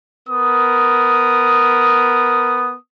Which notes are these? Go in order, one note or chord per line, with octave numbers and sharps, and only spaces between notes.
B3 A#4 D#6